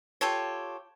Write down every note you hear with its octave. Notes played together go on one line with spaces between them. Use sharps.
F4 G4 A4 C#5